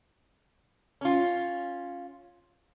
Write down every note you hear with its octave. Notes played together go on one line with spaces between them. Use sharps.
C#4 F4